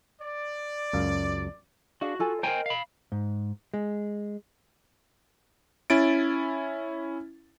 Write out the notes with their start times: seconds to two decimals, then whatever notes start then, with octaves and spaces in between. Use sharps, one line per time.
0.20 D5
0.93 C#2 F#2 F5
2.01 D4 F#4 G#4 F5
2.19 F4 A4 G#5
2.43 A#4 C5 D#5 G5 G#5 A#5
2.66 F5 B5
3.12 G#2
3.74 G#3
5.90 C#4 E4 A6 D7